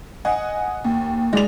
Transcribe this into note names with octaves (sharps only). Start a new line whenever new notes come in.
D#5 F#5 G#5
D#2
G#3 D5 F7